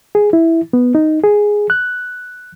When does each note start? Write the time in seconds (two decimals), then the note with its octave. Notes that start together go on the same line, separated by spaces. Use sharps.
0.15 G#4
0.33 E4
0.73 B3
0.95 D#4
1.23 G#4
1.70 F#6